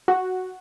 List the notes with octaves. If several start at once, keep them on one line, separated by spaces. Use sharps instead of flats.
F#4